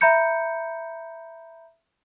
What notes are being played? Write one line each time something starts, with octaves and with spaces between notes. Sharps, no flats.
E5 A#5 B5 G6 C#7